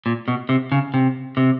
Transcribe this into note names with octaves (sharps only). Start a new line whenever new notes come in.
A#2
B2
C3
C#3
C3
C3